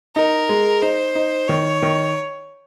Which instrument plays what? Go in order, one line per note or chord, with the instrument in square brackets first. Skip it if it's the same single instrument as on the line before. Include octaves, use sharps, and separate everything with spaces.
[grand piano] D#4 [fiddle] A#4
[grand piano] G#3
[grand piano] D#4 [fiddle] C5
[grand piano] D#4
[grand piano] D#3 [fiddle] C#5
[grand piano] D#3